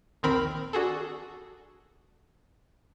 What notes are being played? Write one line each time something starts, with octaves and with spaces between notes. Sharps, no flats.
A#1 D#2 D#3 C4 A#4 B5
D4 F#4 G#4 A4